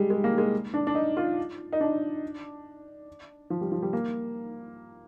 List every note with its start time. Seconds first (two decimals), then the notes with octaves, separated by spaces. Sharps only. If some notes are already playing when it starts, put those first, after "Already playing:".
Already playing: G3 G#3
0.10 G#3
0.24 A#3
0.38 G#3
0.74 D4
0.87 D4
0.95 D#4
1.17 F4
1.73 D#4
1.81 D4
3.50 F3
3.61 G3
3.72 F3
3.82 G3
3.93 A#3